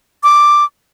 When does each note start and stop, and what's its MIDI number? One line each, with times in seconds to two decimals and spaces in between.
0.23 0.65 86